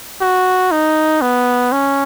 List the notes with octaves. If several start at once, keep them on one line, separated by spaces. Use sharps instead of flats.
F#4
D#4
B3
C#4